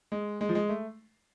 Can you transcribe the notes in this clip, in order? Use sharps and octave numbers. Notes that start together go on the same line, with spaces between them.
G#3
G#3
F3
G#3
A3